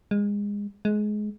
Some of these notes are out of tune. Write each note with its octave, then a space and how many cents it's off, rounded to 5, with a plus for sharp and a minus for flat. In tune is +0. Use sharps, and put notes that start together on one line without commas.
G#3 -25
G#3 +20